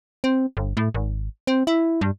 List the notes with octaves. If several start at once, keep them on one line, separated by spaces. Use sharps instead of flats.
C4
G1
A2
G#1
C4
E4
G2